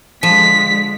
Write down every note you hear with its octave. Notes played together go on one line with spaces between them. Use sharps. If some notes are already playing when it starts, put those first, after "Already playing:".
D3 F3 G#3 B6